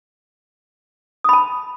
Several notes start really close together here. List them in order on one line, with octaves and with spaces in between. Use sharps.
D#6 B5 A5